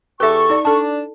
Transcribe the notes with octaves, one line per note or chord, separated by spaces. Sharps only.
E2 G4 A4 B4 E5 C#6
D#4 D5
D4 A4 A5